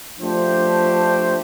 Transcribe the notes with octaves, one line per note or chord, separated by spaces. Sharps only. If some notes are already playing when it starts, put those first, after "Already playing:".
F3 A3 D4 G4 C5